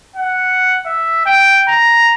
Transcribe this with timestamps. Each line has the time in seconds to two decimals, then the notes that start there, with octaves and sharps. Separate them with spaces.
0.16 F#5
0.86 E5
1.26 G5
1.68 A#5